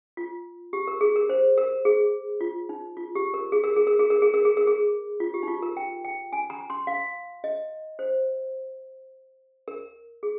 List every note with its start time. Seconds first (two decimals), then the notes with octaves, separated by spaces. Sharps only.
0.17 F4
0.73 G4
0.88 A#4
1.01 G#4
1.16 A#4
1.29 C5
1.58 A#4
1.85 G#4
2.41 F4
2.69 D#4
2.97 F4
3.15 G4
3.34 A#4
3.52 G#4
3.64 A#4
3.76 G#4
3.87 A#4
3.99 G#4
4.10 A#4
4.22 G#4
4.34 A#4
4.45 G#4
4.57 A#4
4.67 G#4
5.20 F4
5.34 G4
5.43 D#4
5.48 F4
5.62 A#4
5.77 G5
6.04 G5
6.33 G#5
6.50 A#5
6.70 C6
6.87 F5
7.44 D#5
7.99 C5
9.68 A#4
10.23 G#4